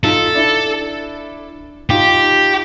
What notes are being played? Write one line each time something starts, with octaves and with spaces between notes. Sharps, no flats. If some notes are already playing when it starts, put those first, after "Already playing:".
D#4 F4 A4
D4 E4
D#4 F4 G4